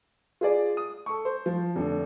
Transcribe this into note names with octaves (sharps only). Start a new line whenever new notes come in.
F4 G#4 D5
D#6
A4 C#6
C5
F3
F1 D3